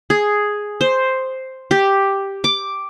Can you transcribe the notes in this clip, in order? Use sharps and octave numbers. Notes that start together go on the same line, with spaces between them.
G#4
C5
G4
D6